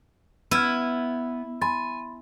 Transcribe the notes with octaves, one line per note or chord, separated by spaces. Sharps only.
B3 E4 F6 G#6 D#7
G#5 B5 C6 A6